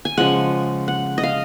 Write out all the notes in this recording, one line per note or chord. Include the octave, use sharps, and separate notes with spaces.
G#5
C#3 F3 G#3 F#5
F#5
D#5
F5